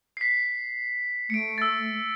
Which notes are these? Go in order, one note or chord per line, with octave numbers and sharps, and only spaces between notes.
B6 C7
A3 C#7 D7
E6 A6